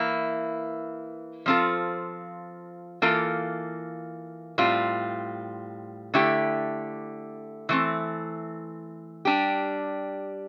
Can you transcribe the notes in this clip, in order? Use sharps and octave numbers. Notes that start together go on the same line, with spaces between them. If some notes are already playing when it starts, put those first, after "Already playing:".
Already playing: E3 A#3 E4
F3 C4 F4 A4
E3 A#3 F4 A4
A2 G3 C4 F4
D3 A3 E4 G4
E3 A3 C4
G3 D4 G4